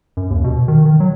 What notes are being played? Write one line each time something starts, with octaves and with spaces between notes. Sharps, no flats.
F#2
D#2
B2
D#3
D#3
F#3